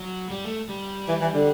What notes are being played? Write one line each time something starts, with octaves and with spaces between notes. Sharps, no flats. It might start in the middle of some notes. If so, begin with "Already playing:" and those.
Already playing: F#3
G3
A3
G3
E3
E3
D3